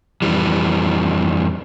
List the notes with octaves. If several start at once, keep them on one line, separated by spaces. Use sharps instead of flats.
F2 E3 G3